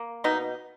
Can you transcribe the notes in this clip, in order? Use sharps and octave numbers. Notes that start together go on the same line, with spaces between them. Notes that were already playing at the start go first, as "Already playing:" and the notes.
Already playing: A#3
B2 D#4